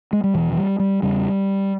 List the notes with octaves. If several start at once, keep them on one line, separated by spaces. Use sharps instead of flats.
G#3
G3
E2 B2 E3
E3
G3
G3
E2 C#3 G3